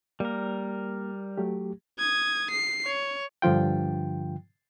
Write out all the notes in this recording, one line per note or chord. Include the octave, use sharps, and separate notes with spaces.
G3 A#3 A#4
F#3 A3 G4
D#6 G#6
C7
C#5
G2 D3 F3 F4 G5